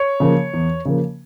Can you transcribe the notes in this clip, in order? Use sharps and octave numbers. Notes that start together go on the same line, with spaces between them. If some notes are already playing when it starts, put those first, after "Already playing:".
Already playing: C#5
C#3 F3 A#3
E2
C#3 F3 A#3